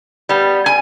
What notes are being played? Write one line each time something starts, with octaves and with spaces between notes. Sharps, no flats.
G3 B3
G#5